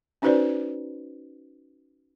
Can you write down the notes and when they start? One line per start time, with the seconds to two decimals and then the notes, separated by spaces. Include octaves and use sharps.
0.22 C#4 D#4 F#4 B4 C5 D5